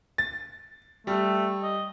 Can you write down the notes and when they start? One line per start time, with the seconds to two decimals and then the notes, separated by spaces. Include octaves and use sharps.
0.18 A6
1.07 G3 A3
1.63 D#5